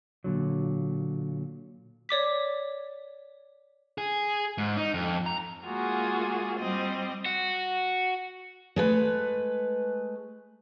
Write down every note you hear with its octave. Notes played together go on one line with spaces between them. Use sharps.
A#2 D3 F#3
C#5 D5 D6 B6
G#4
G#2
D#4
F2
A#5
G#3 A#3 F4 F#4 G#4
G3 C4 D#5
F#4
G#3 A3 B4